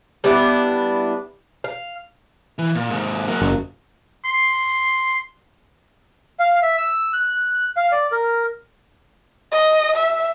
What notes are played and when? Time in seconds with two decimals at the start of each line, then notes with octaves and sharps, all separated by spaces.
0.24 G3 B3 D4 E4
1.64 F5
2.59 E3
2.75 A#2
2.90 D#2 G#2
3.28 F#3 A#3
3.41 F#1
4.25 C6
6.40 F5
6.63 E5
6.77 E6
7.13 F#6
7.77 F5
7.92 D5
8.12 A#4
9.52 D#5
9.96 E5